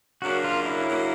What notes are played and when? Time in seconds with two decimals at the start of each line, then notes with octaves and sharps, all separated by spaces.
0.22 F#2 C#3 F#3 A#3 D4 F#4
0.44 F4
0.66 E4
0.88 F#2 C#3 F#3 A#3 D4